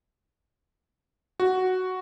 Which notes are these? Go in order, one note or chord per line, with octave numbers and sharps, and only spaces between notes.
F#4